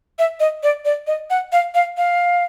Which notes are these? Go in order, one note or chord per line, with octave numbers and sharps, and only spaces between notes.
E5
D#5
D5
D5
D#5
F#5
F5
F5
F5